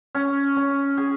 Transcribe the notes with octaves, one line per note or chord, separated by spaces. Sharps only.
C#4
C#4
G#4